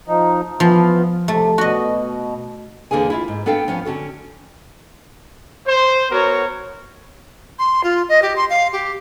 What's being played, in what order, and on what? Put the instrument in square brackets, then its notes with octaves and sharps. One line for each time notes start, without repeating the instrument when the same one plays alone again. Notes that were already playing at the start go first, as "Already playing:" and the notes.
[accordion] F3 D#4
[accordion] E3 B3 F4 [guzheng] F3
[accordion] C3 [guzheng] A3
[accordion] B2 [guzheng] F#4 D#5
[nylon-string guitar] E2 D3 A#3 G#4 G#5
E4 F4 E5
G#2
B3 D4 A4 F5 G5
F3 B3 C#4
D3 C#4 F#4 A4
[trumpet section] C5
B3 F#4 A#4 C#5
[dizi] C6
F4
D#5
G4
C6
F5
G4